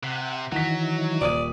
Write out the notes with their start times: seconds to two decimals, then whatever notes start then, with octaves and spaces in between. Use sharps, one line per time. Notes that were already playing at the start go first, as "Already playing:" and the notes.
0.03 C3 F#5
0.52 D#3 E3 F#3 F#5 B6
1.21 D#1 D5 D#6 D#7